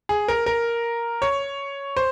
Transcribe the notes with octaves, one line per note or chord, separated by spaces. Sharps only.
G#4
A#4
A#4
C#5
C5